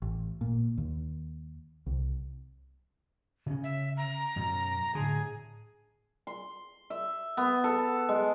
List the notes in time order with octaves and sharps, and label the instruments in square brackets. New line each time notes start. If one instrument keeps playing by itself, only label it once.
[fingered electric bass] A1
A#2
D#2
C2
[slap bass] C#3 C#4
[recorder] E5
A#5
[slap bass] F#2 B2
[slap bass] A2 D3 [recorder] G#4
[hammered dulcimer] C6
E5
B3
A4
G#3